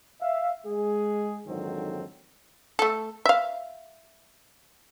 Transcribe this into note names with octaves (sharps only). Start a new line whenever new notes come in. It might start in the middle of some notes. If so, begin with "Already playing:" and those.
E5 F5
G#3 G#4
F2 G#2 D3 D#3 F#3 C4
A3 A4
E5 F5